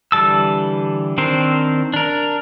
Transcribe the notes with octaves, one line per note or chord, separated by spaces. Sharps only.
D3 E3 G3 A5 E6
D#3 C4 D4 A#4 C5
D4 A#4